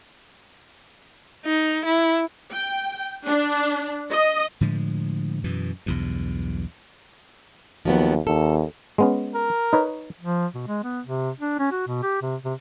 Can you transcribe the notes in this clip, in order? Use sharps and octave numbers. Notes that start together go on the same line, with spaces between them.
D#4
E4
G5
D4
D#5
A2 D3 F3 G#3
F#2 B2 E3
B1 E2 G2
D#2 F3 F#3 B3
D#2 A4
G#3 B3 C#4
A#4
D#4 B4 C#5
F3
B2
G#3
B3
C3
D4
C#4
F#4
B2
G4
C3
C3